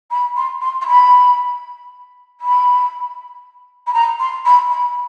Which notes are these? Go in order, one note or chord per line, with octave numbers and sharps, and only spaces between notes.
B5
C6
C6
C6
B5
B5
B5
A#5
C6
B5
B5